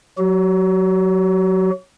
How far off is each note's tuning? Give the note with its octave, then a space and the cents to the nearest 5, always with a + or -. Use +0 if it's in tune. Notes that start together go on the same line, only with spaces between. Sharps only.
F#3 -10 F#4 +40